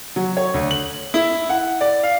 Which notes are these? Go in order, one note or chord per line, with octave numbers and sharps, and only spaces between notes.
F#3
C#5
D2
F#7
E4
F#5
D5
F5